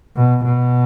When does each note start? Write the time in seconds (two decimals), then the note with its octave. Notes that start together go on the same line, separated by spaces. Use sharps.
0.16 B2
0.45 B2